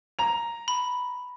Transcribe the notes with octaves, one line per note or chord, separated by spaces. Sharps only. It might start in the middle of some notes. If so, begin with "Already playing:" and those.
A#5 F7
B5